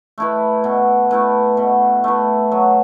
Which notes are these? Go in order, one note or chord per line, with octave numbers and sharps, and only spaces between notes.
A3 E4 B4
B2
A3 E4 B4
B2
A3 E4 B4
F#3